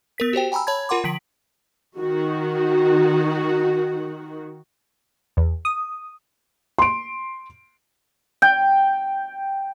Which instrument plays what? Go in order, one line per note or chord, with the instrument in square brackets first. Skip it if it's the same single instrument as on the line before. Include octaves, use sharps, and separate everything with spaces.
[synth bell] B3 A#4 B6
F#4 G4 C5 G5
G5 G#5 A#5 B5 E6
C#5 A5 B5 G#6
F4 A#4 F#5 C6 D6
D3 F3 B6 D7 F#7
[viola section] D#3 F#4
[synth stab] E2
D#6
[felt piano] C6 D7
[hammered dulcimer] G5